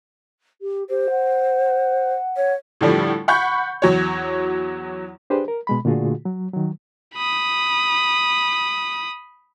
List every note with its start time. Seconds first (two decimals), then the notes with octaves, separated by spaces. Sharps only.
0.62 G4
0.89 G4 C5
1.10 F#5
2.37 C#5
2.81 A2 D3 F3 G3
3.28 F#5 B5 C#6 G6
3.82 E2 F#3 C#5
5.30 D4 G4 G#4 B4 C5
5.48 A#4
5.67 B2 G#3 B5
5.85 A#2 D3 A3 F4 F#4 G#4
6.25 F#3
6.54 D#3 F#3
7.15 B5 D#6